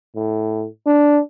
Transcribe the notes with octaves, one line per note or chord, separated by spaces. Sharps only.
A2
D4